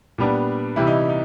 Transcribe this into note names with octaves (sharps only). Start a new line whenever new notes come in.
A#2 G3 B3 D4
C3 E3 G3 E4
D#4
D#4